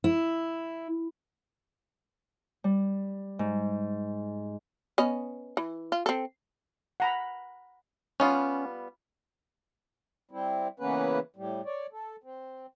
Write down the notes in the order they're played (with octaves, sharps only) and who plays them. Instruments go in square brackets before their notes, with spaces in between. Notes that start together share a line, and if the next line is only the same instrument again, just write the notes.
[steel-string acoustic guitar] E4
[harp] G3
G#2
[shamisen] B3 C#4 D#5
E3
F4
C4 A4
[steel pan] F#5 A#5 B5
[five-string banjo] G3 B3 F4 [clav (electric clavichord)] C#4
[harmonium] G3 C4 E4
C#3 E3 A#3 B3 C#4 B4
A2 G3
C#5 D5
A4
C4